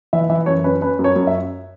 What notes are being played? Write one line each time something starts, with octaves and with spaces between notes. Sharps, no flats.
E3 E5
E3 E5
F#2 C#5
C#4 B4
C#4 B4
F#2
C#5
F#2
E5